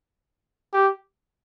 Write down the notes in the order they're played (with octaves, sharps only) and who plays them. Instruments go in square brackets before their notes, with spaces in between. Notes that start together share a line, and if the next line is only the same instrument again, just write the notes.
[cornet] G4